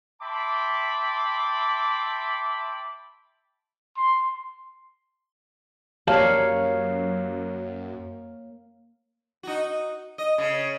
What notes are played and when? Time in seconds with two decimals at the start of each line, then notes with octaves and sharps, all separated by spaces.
0.22 E5 G5 A5 B5 C6 D6
3.97 C6
6.07 F#2 A#3 G4 C#5 D5 F5 A5
9.43 D#4 F#4
10.18 D#5
10.38 C#3